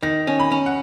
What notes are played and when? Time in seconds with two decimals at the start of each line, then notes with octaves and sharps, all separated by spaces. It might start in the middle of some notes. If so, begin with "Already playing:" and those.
0.03 D#3 A#6
0.27 C#4
0.40 B5
0.52 C#4
0.66 F#5